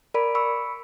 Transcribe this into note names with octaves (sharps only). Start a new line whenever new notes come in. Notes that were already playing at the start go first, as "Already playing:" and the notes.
A#4 D5 B5 D7
B5 C#6 E6 C#7